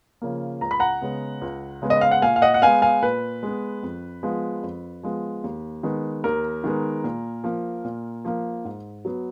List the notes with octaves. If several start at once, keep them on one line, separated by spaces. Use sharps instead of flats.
C#3 F3 A#3
C#2 A#5
B5
F#5 A#5
C#3 G#3 B3
C#2
C#3 G#3 B3
D#5
F5
F#5
A#2 F5 G#5
F5
D#5 F#5
F#5
G#3 B3 F5 G#5
F5 G#5
A#2 B4
G#3 B3
F2
F3 G#3 B3
F2
F3 G#3 B3
D#2
D#3 G#3 B3
D#2 A#4
D#3 G#3 B3
A#2
F3 A#3
A#2
F3 A#3
G#2
F#3 B3